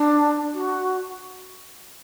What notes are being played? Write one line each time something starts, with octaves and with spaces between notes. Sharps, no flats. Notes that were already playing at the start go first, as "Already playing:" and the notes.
Already playing: D4
F#4